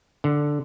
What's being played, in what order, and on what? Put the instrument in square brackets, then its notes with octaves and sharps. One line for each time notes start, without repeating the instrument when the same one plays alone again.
[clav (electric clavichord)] D3